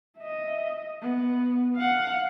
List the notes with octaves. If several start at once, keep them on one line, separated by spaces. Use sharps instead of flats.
D#5 E5
B3
F5 F#5